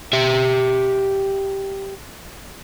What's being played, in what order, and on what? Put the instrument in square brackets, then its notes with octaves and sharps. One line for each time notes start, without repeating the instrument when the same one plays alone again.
[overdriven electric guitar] G4 E5